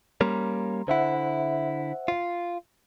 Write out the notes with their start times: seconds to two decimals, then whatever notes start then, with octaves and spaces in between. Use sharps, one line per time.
0.21 G3 A#3 C#4 A#5 C6
0.88 D3 E4 C5 E5 F#5
2.08 F4